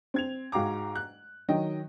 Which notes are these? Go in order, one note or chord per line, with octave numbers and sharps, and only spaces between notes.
C4 G#6 F7
G#2 F#4 F5 G5 A#5 D6
F#6
D#3 F#3 D#5 G5